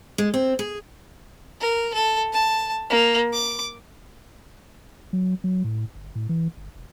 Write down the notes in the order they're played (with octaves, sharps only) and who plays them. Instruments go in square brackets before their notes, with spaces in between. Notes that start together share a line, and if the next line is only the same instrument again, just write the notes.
[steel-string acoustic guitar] G#3
C4
G#4
[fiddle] A#4
A4
A5
A#3
D6
[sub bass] F#3
F#3
A2
G1
A2
E3
G1
E1